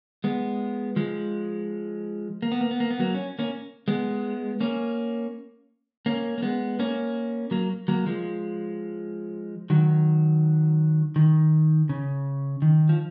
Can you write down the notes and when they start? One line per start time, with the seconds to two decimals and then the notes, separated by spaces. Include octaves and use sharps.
0.24 G#3 B3
0.96 F3 G#3
2.42 A#3
2.52 B3
2.61 A#3
2.71 B3
2.80 A#3
2.91 B3
3.00 F#3 A#3
3.14 C#4
3.39 A#3 C#4
3.88 G#3 B3
4.60 A#3 C#4
6.06 A#3 C#4
6.38 A#3
6.42 G#3 B3
6.79 A#3 C#4
7.51 F#3 A#3
7.88 F#3 A#3
8.06 F3 G#3
9.70 D#3 F#3
11.16 D#3
11.89 C#3
12.62 D#3
12.89 F3